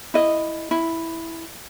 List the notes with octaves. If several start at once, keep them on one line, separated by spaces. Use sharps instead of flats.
E4 D#5
E4